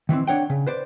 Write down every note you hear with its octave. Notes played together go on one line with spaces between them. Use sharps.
D#3 E3 A3 C4
D4 C#5 F#5 G5
C#3
B4 C5 D5